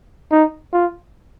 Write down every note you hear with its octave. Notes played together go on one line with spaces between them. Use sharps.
D#4
F4